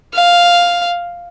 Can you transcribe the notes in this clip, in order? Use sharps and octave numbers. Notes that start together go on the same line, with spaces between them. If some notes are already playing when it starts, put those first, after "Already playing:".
F5